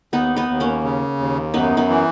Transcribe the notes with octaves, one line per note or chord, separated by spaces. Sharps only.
D#2 B3 D#4
B3 D#4
D#2
A#3 C#4
C#3
D#2
F#2 B3 D#4
B3 D#4
E3